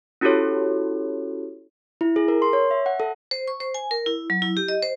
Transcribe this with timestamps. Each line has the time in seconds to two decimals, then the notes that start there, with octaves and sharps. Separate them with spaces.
0.21 C#4 E4 F#4 G4 A4 C#5
2.01 E4
2.16 G#4
2.28 A#4
2.42 C6
2.53 C#5
2.71 E5
2.86 F#5
3.00 A4
3.31 C5
3.48 C#6
3.60 C5
3.74 G#5
3.91 A#4
4.06 E4
4.30 F#3
4.42 E4
4.57 G4
4.68 D#5
4.82 C5